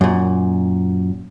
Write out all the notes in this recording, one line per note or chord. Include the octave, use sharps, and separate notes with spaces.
F#2 A#2